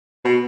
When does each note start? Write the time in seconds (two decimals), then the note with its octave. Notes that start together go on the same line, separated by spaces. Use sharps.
0.25 B2